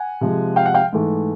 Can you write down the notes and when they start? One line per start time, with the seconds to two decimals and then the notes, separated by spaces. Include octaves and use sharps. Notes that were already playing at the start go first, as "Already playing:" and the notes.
Already playing: F#5 G#5
0.21 C3 F3 G#3
0.56 F5 G5
0.66 F#5
0.75 F5 G5
0.93 G#2 E3 A3